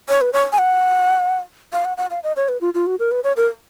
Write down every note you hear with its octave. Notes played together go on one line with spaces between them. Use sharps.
C#5
B4
C#5
G#5
F#5
F5
F#5
F#5
F5
D#5
C#5
B4
F4
F4
F#4
A#4
B4
C#5
A#4